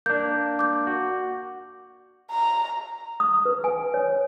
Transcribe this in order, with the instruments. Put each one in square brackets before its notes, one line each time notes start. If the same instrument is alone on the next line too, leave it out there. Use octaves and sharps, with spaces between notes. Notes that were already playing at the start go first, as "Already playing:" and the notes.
[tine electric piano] A#3 D4 [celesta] G6
[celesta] D6 G6
[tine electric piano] F#4
[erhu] A#5
[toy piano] D#6
B4
G#5
C#5